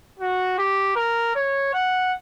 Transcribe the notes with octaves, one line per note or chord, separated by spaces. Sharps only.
F#4
G4
A#4
C#5
F#5